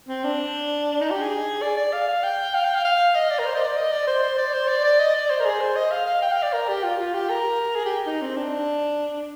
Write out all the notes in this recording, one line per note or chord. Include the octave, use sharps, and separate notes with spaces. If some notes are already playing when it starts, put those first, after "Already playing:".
C4
D4
D#4
G4
G#4
D5
D5
F5
F5
G5
F5
G5
F5
F5
D#5
D5
A#4
C5
D#5
D5
D#5
D5
C5
C5
D5
C5
D5
D5
D#5
D5
C5
A#4
G#4
C5
D#5
F5
F5
G5
F5
D5
A#4
G4
F4
F4
G4
A#4
G#4
G4
D#4
C4
D4